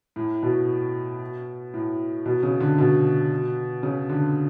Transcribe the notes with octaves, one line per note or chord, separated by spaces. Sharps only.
A2
B2
A2
B2
C#3
D3
B2
C#3
D3